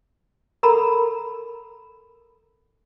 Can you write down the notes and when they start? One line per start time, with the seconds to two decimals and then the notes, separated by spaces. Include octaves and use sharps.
0.63 A4 A#4 A#5 B5